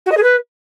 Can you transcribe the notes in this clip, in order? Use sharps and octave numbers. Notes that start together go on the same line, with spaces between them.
F#4
D#5
G#4
B4